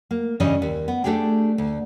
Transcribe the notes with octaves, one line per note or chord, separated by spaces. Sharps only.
A#3
G2 C#3 E3 G3 C#4 D#5
D#2
B3
A3 D4 G4 G#4 G5
D2